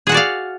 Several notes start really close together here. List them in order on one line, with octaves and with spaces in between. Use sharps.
G#4 F#5 F#4 D5 F5